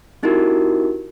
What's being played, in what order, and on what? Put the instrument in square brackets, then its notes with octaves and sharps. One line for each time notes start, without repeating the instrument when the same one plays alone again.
[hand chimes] C4 D#4 E4 F#4 G4 A#4